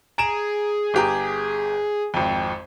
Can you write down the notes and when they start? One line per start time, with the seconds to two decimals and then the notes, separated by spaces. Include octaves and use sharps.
0.18 G#4 A#5 D7 E7
0.94 G1 G4 A#5
2.14 G#1 F2